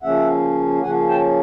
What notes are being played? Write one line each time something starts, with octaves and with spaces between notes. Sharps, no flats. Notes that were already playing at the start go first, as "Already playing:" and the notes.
C#3 F3 A#3 C#4 E5 F#5
C#3 F3 A#3 C#4 F#5 G#5
G5 A5